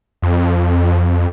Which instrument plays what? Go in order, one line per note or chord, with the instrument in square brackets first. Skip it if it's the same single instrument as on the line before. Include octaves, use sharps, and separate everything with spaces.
[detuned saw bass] F2